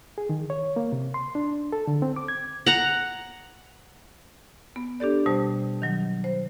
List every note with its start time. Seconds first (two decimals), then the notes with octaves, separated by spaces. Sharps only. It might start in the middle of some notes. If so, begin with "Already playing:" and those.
0.18 G#4
0.29 D#3
0.50 C#5
0.76 A#3
0.92 C3
1.14 C6
1.35 D4
1.72 A4
1.87 D3
2.02 C4
2.16 D6
2.28 G#6
2.67 F#5 A#5
4.76 B3
5.00 D4 G4 A4 D5
5.26 B2 G3 C5 A5
5.82 D#3 F#3
6.24 C5